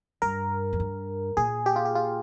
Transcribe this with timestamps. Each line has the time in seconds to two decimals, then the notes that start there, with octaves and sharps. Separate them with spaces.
0.22 G2 A#4
0.73 F2
0.80 G2
1.37 A#2 G#4
1.66 G4
1.76 F4
1.85 G4
1.95 F4